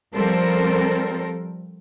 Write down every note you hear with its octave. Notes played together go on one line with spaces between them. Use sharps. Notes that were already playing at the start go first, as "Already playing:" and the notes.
F3 G3 C4 A4 A#4 C5